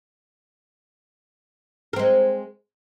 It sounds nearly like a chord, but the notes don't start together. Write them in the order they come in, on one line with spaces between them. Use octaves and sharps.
A#4 C4 G#3